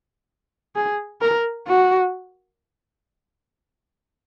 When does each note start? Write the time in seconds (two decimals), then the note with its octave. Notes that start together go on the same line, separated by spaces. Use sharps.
0.76 G#4
1.21 A#4
1.68 F#4